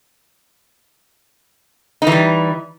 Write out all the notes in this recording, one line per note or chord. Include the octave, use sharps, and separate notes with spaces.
E3 G3 D#4